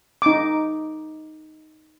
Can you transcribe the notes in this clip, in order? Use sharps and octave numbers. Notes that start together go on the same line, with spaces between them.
D#4 D6